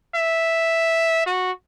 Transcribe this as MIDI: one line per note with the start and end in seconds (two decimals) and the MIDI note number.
0.16 1.24 76
1.26 1.51 66